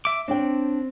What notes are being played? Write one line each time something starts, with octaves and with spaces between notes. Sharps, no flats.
E5 D6
C4 D4 C#5 G5